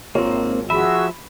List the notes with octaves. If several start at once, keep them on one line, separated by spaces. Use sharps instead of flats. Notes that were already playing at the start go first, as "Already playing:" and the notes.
G#1 A#3 C4 F4 A#4 C#5
F3 F#4 G#4 E5 B5 E6